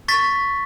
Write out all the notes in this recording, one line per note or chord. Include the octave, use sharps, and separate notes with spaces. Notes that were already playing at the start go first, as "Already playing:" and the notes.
C#6 A6 B6